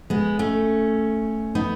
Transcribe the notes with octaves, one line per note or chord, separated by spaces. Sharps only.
G#3 B3
A3 C#4
B3 D#4